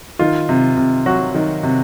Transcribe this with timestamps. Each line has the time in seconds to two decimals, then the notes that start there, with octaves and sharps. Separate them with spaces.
0.19 D#3 F4
0.49 C3
0.77 C3
1.06 F#3 F#4
1.35 D#3
1.63 C3